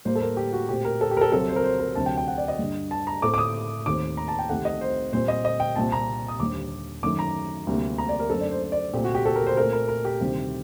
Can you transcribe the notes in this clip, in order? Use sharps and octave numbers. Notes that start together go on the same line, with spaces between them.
A2 G3 A#3 C5
A4
A#4
G4
F#4
A#2 A3 C4 G4
A#4
A4
G4
A#4
A4
C2 C3 F#3 C4 A4
C5
A#4
C5
A#4
D2 C3 F#3 C4 A5
G5
G5
F#5
D5
D#5
G2 D3 G3
A5
A#5
A2 A3 C4 D6
D6
D#6
D#2 D#3 A3 C4 D6
A#5
A5
G5
C2 C3 D#3 A3 F#5
D#5
C5
A#2 G3 C4 C5
D#5
D#5
G5
C2 A#2 G3 C4 A5
A#5
D#6
D#2 D3 G3 C4 D6
F#2 D#3 A3 D6
A#5
D2 C3 G3 A#3
A#5
D5
A#4
F#2 D3 A3 C4 A4
D5
C5
C5
D5
C2 A#2 A3 C4 G4
F#4
G4
A4
A#4
C5
A#2 A3 C4 A#4
A#4
A#4
G4
D2 C3 D#3 G3 C4